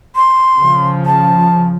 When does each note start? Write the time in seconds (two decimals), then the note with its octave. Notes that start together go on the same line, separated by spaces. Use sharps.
0.16 C6
0.57 C#3 F3
1.06 A5